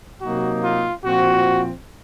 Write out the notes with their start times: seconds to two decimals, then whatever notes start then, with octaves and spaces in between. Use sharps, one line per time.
0.22 C3 F#3 A#3 D#4 F#4
0.64 F4
1.05 A#2 F3 C4 F#4